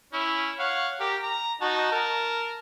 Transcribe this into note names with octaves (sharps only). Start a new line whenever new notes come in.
C#4 E4
C#5 F5 F#5
G4 A#4
A#5
D#4 F#4 A5
A#4 A5